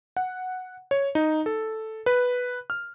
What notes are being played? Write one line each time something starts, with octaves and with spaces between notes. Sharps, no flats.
F#5
C#5
D#4
A4
B4
F6